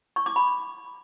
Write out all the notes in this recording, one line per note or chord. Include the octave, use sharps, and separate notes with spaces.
C#6
D6
B5